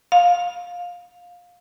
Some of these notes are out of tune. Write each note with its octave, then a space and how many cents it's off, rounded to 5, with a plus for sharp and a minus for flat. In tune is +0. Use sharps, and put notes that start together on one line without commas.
F5 +20